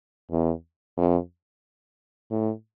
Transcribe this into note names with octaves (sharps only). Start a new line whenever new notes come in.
E2
F2
A2